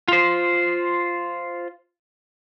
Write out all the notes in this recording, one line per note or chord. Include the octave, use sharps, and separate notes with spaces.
F4 C5